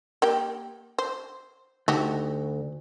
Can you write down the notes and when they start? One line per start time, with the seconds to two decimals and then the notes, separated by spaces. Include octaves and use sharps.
0.22 A#3 G4 G5
0.98 C5
1.88 D2 D#4 F#4 G4